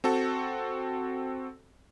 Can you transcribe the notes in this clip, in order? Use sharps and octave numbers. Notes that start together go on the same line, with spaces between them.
C4 F#4 A4